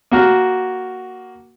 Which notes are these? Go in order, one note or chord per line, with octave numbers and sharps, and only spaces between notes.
A#3 F#4 F6